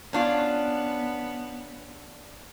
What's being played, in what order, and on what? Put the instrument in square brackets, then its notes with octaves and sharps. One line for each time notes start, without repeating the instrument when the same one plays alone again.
[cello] B3 [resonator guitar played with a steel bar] C#4 D4 F4